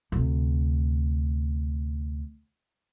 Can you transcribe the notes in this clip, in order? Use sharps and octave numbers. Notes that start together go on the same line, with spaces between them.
D2 C3